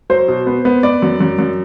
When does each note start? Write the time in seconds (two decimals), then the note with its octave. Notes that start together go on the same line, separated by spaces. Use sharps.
0.10 F#3 C5
0.28 B2
0.47 B3
0.65 B3
0.83 B3 D5
1.02 F#2
1.21 F#2
1.39 F#2